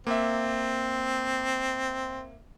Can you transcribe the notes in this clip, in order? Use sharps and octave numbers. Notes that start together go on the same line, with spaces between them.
A#3 C4 E5